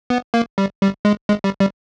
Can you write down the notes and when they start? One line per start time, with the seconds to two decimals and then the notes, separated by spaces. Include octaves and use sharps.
0.10 B3
0.34 A#3
0.58 G3
0.81 G3
1.05 G#3
1.28 G#3
1.44 G3
1.60 G3